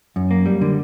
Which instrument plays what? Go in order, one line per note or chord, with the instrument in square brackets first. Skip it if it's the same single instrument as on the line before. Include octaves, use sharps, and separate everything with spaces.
[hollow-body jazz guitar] F#2
A#3
G3
D3